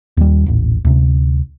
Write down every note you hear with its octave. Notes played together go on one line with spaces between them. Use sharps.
D#2 G3
D#1 A1
D2 C3